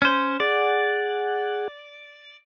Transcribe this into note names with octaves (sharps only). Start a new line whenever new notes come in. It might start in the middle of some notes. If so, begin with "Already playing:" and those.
C#4 C5
G#4 D5 F#5